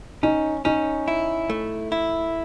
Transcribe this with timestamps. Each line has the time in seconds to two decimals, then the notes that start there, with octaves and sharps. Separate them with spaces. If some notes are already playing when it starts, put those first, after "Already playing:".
0.23 C#4 D#4
0.65 C#4 D#4
1.08 E4
1.50 A3
1.92 E4